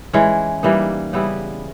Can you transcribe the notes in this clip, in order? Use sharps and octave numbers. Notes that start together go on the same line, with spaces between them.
E3 G#3 C#4
E3 G3 A#3 D#4
C#3 G3 B3 E4